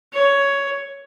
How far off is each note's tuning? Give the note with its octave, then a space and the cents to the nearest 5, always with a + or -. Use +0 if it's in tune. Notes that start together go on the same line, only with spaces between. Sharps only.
C#5 +10